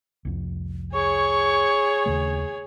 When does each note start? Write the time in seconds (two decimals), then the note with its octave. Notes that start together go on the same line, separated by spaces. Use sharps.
0.25 C2 F2
0.93 G#4 C#5 C#6
2.06 D#2 C#3 A3